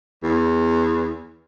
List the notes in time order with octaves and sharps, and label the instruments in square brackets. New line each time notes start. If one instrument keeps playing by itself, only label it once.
[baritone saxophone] E2